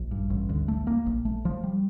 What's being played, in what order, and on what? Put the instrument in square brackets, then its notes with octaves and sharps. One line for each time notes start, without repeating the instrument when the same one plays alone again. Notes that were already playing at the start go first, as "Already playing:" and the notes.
Already playing: [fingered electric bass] A#1
G2
A1
D2
A3
A#3
A#1
A3
F3
G3